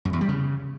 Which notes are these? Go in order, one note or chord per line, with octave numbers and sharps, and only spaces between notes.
F#2
E2
G3
C#3